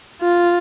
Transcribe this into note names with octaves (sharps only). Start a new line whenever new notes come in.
F4